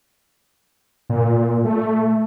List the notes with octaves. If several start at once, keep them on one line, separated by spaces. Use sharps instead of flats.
A#2
A3